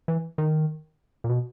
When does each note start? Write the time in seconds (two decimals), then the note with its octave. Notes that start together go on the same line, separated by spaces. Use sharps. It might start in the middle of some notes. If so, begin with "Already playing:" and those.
0.08 E3
0.38 D#3
1.24 A#2
1.30 B2